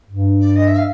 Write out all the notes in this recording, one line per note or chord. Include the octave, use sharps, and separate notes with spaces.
G2
D5
D#5
E5
F5